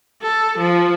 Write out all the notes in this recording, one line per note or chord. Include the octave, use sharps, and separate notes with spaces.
A4
F3